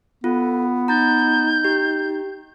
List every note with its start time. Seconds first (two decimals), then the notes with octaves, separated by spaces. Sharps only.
0.24 B3 F4 A4
0.88 D#4 A#5 G6 A6
1.65 G4